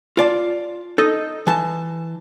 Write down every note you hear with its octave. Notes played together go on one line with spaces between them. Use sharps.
F4 D5 A5
D#4 A4 D#5
E3 A5